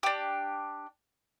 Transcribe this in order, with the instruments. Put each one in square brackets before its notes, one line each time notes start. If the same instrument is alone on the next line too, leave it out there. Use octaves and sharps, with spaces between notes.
[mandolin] D4 G4